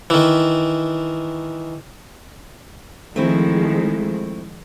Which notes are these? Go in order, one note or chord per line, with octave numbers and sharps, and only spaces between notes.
D#3 E3
D#3 F3 G#3 A3 C4 E4